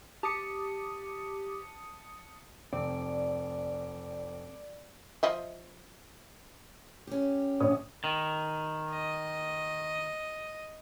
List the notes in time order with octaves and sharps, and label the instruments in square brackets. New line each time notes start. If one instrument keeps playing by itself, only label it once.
[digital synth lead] G4 [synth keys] A5 D#6 C#7
[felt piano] F1 [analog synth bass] C4 [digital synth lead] D5
[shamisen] F3 D#5 E5
[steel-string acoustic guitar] C#4 G4
[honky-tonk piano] A#1 C#5 D#6
[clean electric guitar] D#3
[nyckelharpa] D#5